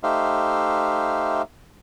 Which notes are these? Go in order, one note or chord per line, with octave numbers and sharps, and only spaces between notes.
A3 D#4 G4 C5 E5 F5